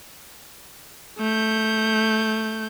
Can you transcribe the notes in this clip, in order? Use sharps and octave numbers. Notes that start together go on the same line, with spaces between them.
A3 G6